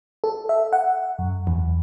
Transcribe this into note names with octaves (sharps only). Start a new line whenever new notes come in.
A4
E5
F#5
F#2
E2